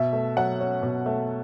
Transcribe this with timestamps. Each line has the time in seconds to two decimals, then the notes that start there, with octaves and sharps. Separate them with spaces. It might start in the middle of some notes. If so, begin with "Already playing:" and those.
Already playing: B2 E5
0.13 A3
0.37 F#3 F#5
0.60 C#4
0.83 B2
1.06 A3